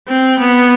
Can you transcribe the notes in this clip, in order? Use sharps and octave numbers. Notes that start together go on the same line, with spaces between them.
C4
B3